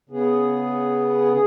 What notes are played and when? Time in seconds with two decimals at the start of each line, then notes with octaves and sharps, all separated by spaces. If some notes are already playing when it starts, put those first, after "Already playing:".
0.09 C#3 B3 G#4
1.32 G#4